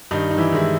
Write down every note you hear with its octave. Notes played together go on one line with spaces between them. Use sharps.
G2 D#3 D#4
D#4
E3 E4
D#3 G#3 E4